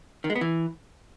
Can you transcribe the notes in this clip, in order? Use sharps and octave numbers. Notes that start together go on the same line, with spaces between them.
D#3
G#3
B3
E3